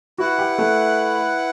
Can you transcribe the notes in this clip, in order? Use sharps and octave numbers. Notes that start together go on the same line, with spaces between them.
E4 F#4 B4 F#5
G4
A3